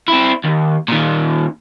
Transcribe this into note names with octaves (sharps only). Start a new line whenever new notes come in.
C4 E4
D#2
A#2 D#3